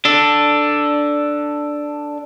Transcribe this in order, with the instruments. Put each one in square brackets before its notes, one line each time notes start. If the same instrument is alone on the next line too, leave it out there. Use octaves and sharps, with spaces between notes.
[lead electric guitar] D4 A4